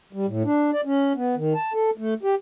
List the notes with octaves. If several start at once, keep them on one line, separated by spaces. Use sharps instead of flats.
G3
A2
D4
D5
C#4
B3
D#3
A5
A4
A3
G4